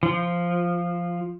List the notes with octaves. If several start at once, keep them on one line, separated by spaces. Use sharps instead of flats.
F3